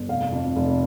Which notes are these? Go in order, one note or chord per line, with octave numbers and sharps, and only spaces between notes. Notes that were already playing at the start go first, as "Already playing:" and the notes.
Already playing: G1
F1 F5
F2
F1